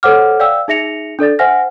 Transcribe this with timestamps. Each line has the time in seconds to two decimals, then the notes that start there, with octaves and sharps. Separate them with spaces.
0.03 A4 C5 C#5 F#5 D6 F6
0.40 D5 F5 G5 E6
0.68 D#4 G#4 E5 A#6 C#7 F7
1.19 D4 A4 D5 A6
1.39 C5 E5 F#5 G#5 F6 A#6